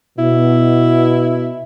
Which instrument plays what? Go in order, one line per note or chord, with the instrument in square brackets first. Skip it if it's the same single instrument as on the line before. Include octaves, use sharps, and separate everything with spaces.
[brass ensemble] B2 [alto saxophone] E4